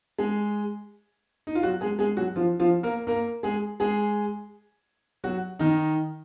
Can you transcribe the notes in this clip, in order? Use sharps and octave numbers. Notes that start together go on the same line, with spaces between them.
G#3 G#4
D#4
F4
F#3 F#4
G#3 G#4
G#3 G#4
F#3 F#4
F3 F4
F3 F4
A#3 A#4
A#3 A#4
G#3 G#4
G#3 G#4
F#3 F#4
D#3 D#4